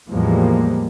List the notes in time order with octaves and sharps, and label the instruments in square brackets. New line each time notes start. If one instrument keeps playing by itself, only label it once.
[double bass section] E2 A2 F3 G3 G#3 A#3